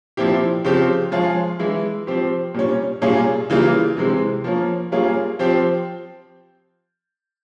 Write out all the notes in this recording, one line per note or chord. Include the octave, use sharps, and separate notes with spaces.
A#2 F3 C4 E4 G4
C#3 F3 C4 G4
F3 G#3 C#4 F4 G#4
E3 G#3 E4
F3 C4 G4
A#2 G3 C#4
A#2 G3 C#4 F4 G#4
C#3 E3 G3 A#3 F4
C3 E3 G#3 C4
F3 A#3 C#4
G3 A#3 C#4 F4 G#4
F3 C4 G4